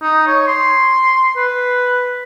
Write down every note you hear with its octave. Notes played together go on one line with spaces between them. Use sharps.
D#4
C#5
C6
B4